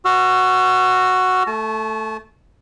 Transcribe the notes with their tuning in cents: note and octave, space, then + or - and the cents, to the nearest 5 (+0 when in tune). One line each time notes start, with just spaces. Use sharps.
F#4 +0 E6 +45
A3 +0 A5 -35